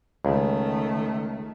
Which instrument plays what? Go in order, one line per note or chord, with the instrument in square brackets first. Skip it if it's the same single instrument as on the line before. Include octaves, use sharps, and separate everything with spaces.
[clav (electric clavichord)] C#2 [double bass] D#3 A3